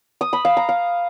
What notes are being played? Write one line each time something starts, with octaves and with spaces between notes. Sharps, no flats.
D#6
B5
F5
A#5
F5